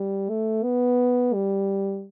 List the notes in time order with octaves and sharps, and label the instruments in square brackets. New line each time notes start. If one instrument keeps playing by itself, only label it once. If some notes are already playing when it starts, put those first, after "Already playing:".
Already playing: [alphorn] G3
A3
B3
G3